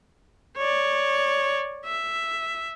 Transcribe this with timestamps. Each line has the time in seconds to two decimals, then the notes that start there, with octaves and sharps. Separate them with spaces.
0.57 C#5 D5
1.85 E5